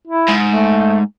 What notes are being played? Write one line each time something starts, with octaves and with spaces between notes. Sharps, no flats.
E4
G#2
A3